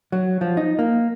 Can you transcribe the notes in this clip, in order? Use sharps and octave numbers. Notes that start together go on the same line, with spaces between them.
F#3
F3
D#4
A#3